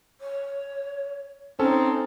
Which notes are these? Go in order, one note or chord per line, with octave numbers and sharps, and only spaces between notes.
C#5
C4 C#4 D#4 A4 A5